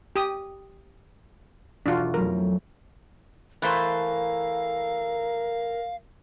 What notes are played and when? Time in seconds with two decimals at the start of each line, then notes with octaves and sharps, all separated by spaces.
0.16 G4 D#6
1.86 E1 D4 F4 F#4
2.14 F2 F#3 A3 A#4
3.62 E3 A3 A#4 C5 F5